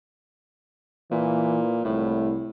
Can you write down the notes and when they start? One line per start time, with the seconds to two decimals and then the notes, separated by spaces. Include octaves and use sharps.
1.11 A#2 E3
1.85 C2 A2